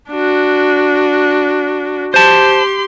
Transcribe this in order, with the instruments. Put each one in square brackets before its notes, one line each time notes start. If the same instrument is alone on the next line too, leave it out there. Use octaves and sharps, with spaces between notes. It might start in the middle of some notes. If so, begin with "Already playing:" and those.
[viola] D4 F#4
[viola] G4 C6 [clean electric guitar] C5 A5